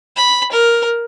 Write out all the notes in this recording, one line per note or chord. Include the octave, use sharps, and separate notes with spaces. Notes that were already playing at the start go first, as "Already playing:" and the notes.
B5
A#4